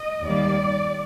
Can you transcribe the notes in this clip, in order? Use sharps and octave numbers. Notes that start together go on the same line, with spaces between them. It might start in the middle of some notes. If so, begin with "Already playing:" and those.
Already playing: D#5
D#2 D#3 G3 A#3 D5